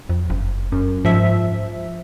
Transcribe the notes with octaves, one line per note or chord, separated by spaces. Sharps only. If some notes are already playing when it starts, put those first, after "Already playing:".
F2
F#1
F#2
G#2 F3 E5